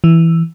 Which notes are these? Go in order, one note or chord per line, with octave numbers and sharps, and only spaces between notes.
E3